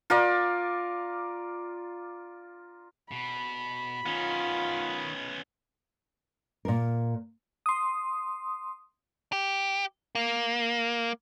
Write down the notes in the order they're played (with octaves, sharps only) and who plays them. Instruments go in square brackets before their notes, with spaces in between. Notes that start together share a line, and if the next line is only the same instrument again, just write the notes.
[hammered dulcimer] F4 A#4 D5
[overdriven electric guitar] B2 [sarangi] B5
[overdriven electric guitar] D#3 [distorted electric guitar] B3 C#4 [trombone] F4
[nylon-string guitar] A#2 A#4
[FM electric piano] C6 D#6
[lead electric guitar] G4
A#3